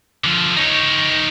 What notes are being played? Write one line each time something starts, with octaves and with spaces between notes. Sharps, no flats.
D3 F3
D#4 C#5